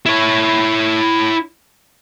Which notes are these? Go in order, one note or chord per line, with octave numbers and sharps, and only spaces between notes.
E4 C#5